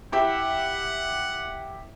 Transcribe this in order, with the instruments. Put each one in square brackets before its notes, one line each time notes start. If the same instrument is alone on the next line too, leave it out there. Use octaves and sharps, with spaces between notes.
[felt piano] E4 G4 E5 [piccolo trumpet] F#5